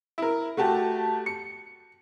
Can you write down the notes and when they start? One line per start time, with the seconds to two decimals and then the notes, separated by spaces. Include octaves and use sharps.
0.18 E4 A#4
0.57 A3 F#4 G4 A5
1.26 C#7